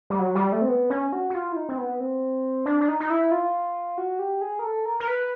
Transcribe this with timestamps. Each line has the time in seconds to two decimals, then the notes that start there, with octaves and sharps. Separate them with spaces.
0.10 G3
0.19 F#3
0.35 G3
0.52 A3
0.62 C4
0.69 B3
0.90 C#4
1.13 F#4
1.30 F#4
1.35 F4
1.52 E4
1.56 D#4
1.69 C4
1.78 B3
2.00 C4
2.66 D4
2.81 D4
2.88 D#4
3.00 D#4
3.10 E4
3.31 F4
3.98 F#4
4.19 G4
4.41 G#4
4.59 A#4
4.64 A4
4.85 A#4
5.00 A#4
5.08 B4